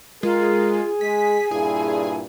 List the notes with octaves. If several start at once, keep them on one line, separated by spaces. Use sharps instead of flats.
G#3 F4 G#4 A#4
G#3 G#5 B6
G2 A#2 E4 G#4